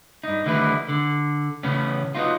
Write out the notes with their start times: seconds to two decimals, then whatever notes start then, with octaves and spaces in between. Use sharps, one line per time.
0.23 G2 D#4
0.46 D3 D#3 G3 A3 E4 B4
0.89 D3
1.63 A2 C#3 E3 B3 C#4
2.15 F#3 B3 D#4 F4